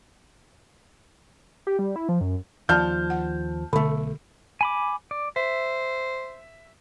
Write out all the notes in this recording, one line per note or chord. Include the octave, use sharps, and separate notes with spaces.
G4
G3
E4
F3
F#2
D#2 F3 D5 A5 F6 G6
F#5
B1 D3 A3
G#5 B5 D6
D5
C5 E5